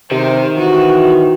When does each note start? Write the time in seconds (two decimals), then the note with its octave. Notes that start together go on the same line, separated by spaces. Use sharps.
0.11 C3 D#3 C5
0.57 E3 F#4